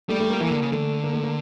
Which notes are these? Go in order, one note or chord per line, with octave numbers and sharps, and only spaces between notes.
G3 A3
A3
A#3
E3 A#3
D3
C#3
D3 A3
A#3
A3
A#3